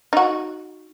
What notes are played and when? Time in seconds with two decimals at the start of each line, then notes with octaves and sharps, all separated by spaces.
0.13 D#4 F#4